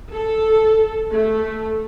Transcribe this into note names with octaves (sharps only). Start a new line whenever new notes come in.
A4
A3